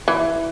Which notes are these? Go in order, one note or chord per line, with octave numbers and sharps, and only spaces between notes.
E3